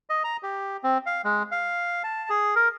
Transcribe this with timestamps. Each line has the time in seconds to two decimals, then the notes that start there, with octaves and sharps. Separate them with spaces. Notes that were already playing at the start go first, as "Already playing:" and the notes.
0.10 D#5
0.24 A#5
0.43 G4
0.84 C4
1.06 F5
1.24 G#3
1.51 F5
2.04 A5
2.30 G#4
2.56 A#4